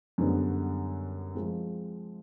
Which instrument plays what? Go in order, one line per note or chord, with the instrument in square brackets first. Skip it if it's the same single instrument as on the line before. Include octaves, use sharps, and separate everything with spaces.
[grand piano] F#2 D3 G3 B3
F3 G#3 C4